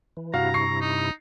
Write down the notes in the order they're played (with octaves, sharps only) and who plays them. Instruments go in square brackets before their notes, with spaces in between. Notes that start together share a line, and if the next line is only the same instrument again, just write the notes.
[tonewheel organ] E3
[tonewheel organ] G2 C3 E4 [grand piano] F#4 F5 [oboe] A#5
[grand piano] C#6 C7
[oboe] D#4